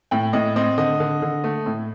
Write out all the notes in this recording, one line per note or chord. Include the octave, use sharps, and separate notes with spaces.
A2 G5
A2 D#5
C4 D#5
D3 D#5
D3
D3
A3
A2